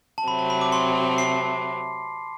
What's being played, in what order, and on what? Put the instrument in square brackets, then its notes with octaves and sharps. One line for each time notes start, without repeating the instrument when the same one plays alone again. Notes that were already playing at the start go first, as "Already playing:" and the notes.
[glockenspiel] A5
[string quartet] C3 F#3 A3 C4 [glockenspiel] B5
[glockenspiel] A5
B5
D6
C6
C7